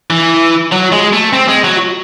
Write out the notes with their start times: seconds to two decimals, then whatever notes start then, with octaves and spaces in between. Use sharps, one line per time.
0.10 E3
0.72 F#3
0.92 G#3
1.13 A3
1.33 C4
1.48 G#3
1.65 F#3